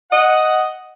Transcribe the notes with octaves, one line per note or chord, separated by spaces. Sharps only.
D#5 F#5